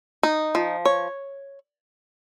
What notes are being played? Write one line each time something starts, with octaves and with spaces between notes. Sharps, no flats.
D#4
F3
C#5